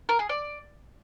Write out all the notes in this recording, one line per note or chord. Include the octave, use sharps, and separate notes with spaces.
A#4
G#4
D5